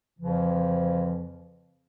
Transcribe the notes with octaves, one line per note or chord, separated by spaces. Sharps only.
F2 C#3 E3 F3